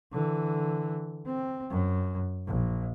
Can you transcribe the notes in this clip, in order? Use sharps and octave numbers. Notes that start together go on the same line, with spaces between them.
D3 E3
C4
F#2
A#1